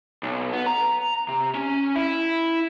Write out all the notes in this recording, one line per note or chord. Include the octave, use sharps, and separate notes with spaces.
B1
B3
A#5
C3
C#4
E4